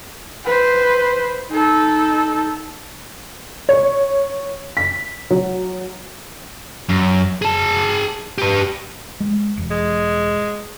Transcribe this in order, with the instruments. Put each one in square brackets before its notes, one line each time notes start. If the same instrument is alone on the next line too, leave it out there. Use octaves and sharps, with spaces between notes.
[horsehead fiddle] B4 C5
D#4 A4
[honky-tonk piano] C#5
B6
F#3
[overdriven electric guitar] F#2
G#4 A5
G4 B4
[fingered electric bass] G#3
E1
[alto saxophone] G#3